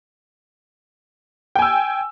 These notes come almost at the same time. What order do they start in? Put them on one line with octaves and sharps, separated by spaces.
G5 G#5 E6